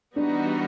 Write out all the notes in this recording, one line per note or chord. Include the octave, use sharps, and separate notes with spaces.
E3 G3 B3 D4 D#4 F#4